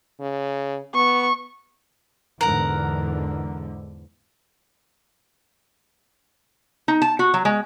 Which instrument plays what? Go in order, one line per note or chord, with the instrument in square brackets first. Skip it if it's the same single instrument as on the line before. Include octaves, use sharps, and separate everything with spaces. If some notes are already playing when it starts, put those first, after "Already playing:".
[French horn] C#3
[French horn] B3 [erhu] C#6
[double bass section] E2 G#2 D3 [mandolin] A#4 F#5
[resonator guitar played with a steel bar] D#4
A5
F#4
F#3
G#3